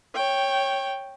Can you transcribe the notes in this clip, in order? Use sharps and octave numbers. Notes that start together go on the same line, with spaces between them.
C#5 G5